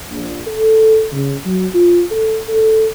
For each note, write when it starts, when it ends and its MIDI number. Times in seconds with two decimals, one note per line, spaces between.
0.10 0.39 34
0.47 1.05 69
1.12 1.32 49
1.46 1.65 54
1.74 2.04 65
2.11 2.37 69
2.49 2.85 69